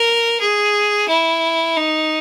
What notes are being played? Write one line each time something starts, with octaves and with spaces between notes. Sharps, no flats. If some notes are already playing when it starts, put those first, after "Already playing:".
Already playing: A#4
G#4
E4
D#4